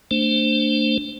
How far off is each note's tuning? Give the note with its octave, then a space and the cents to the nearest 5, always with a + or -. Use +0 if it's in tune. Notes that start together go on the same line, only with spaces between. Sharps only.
A3 +30 D4 +5 C5 +0